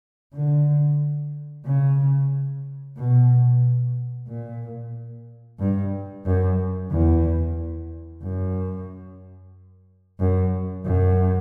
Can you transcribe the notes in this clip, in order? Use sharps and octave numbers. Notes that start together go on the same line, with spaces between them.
D3
C#3
B2
A#2
G2
F#2
E2
F#2
F#2
F#2